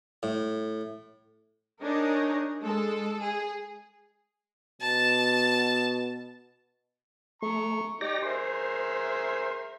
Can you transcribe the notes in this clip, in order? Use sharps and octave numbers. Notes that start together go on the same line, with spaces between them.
A2
D4 D#4 G#4 A#4 C#5 D#5
G#3 A4
G#4
B2 A5
A3 A#5 C#6
D#4 G4 D5 A#6
G#4 A#4 C5 E5